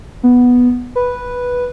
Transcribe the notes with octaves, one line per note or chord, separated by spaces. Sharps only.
B3
B4